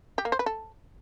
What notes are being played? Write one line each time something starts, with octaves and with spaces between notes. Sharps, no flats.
G4
A#3
C5
B4
A4